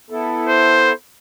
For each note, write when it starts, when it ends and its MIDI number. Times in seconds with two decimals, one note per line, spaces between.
0.10 0.93 59
0.10 0.93 64
0.10 0.93 69
0.48 0.93 72